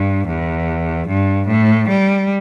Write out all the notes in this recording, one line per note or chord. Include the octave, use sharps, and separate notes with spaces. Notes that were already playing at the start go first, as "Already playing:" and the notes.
Already playing: G2
E2
G2
A2
G3